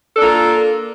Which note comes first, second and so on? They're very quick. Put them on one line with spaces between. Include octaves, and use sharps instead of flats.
A4 D4 A#3 F4